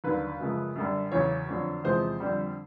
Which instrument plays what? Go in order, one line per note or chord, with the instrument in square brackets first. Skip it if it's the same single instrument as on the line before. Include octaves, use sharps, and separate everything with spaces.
[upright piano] D#2 D3 F#3 B4
F#2 C#3 F3 G#3
F#2 D3 G3
E2 C#3 F#3 C#5
F2 D3 F#3
E2 C3 F3 G#3 C5
F2 D3 G3